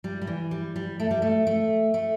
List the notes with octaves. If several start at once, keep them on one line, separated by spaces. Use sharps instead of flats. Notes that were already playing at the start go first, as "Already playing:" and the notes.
G3
G3
E3
G3
G3
A3
G3
A3
A3
A3